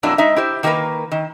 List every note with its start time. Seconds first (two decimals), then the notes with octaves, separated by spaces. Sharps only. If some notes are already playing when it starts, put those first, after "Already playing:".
0.03 F2 A#2 F#3 D4 E4
0.18 G#3 D#4 E5
0.36 E4 G4 C5
0.63 D#3 A#3 G4 G#4 A#4 B4
1.12 D#3